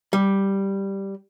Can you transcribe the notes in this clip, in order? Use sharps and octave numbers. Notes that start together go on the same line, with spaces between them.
G3